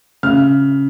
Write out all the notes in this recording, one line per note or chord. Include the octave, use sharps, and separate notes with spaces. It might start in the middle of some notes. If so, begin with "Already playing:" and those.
C#3 F6